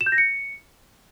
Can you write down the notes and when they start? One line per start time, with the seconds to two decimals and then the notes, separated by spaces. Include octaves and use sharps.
0.01 E7
0.06 G6
0.12 A#6
0.18 C#7